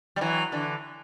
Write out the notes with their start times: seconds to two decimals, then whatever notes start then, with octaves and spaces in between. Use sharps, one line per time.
0.16 G3
0.21 E3 F#3
0.52 D3 E3